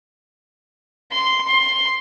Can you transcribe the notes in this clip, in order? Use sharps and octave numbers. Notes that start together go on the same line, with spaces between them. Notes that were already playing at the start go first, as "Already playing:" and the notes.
C6
C6